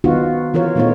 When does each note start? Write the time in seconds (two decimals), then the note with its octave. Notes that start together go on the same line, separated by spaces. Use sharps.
0.04 D#3 B3 D#4 F4 F#4
0.54 E3 F4 A#4 C#5
0.75 A#2 A3 B3 D#4 F4 C#5